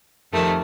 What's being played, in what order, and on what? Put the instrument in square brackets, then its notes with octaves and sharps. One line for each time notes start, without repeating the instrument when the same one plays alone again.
[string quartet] F2 C3 D#3 A3